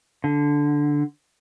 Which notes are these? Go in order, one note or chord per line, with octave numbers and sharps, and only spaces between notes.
D3